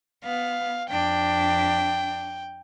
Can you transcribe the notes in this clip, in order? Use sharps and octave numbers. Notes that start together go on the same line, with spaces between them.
B3 F5
F2 D4 G5